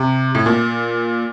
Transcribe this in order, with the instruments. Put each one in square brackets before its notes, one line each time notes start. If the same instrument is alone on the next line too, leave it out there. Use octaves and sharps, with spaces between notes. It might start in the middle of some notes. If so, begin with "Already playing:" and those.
Already playing: [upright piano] C3
A2
A#2